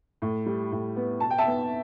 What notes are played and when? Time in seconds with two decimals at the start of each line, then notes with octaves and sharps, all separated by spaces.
0.22 A2
0.46 G3
0.72 A2
0.96 B3
1.20 B2 A5
1.30 G5
1.38 E5 A5
1.46 B3